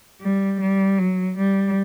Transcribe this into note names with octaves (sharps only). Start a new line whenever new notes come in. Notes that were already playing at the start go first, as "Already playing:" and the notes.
G3
G3
F#3
G3